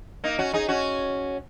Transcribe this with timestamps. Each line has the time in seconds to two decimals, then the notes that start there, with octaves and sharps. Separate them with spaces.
0.24 A#3 D#4
0.39 C#4 F#4
0.53 D#4 G#4
0.68 C#4 F#4